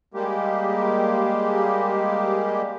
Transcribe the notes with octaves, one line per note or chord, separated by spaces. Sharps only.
G3 G#3 A#3 G4